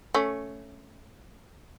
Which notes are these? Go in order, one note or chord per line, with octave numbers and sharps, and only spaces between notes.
A3 C#4